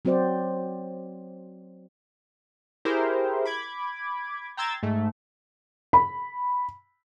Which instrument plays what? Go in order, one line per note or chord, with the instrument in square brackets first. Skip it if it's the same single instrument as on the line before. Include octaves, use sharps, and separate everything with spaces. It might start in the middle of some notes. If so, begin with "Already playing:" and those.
[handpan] F#3 C4 F#4 C5 D5
[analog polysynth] E4 G4 G#4 A#4 C5
B5 D6 G#6
G5 A#5 C6 E6 G#6 A6
G#2 A3
[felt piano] B5